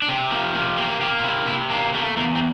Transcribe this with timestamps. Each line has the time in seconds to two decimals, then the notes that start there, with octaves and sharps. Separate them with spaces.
0.02 D4
0.08 C3 C4
0.31 F3 A#3
0.54 C3 A#3
0.77 A#3 C4
1.01 A#3 G4
1.19 F4
1.24 C3 E4
1.46 C3 E4
1.70 A#3 D4
1.93 A3 A#3
2.16 E2 A#3
2.35 C4